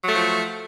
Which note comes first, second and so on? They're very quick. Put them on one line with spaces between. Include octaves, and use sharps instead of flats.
F#3 A3 F3